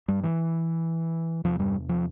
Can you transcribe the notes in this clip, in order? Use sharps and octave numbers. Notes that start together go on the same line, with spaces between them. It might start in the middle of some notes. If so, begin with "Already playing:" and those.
G2 G3
E3
E2 C3 F3
G2 G3
F3